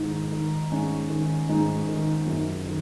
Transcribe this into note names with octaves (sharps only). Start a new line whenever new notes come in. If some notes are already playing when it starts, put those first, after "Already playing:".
Already playing: G#2 D#3 D#4
D#3
G#2 C#4
D#3
G#2 D#4
D#3
F#2
D#3